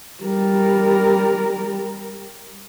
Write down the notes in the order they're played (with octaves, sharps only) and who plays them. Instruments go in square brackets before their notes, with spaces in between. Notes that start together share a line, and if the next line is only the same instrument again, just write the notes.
[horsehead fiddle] G3 A#4